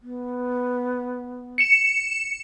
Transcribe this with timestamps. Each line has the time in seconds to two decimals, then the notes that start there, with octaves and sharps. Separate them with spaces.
0.02 B3
1.58 C#7 E7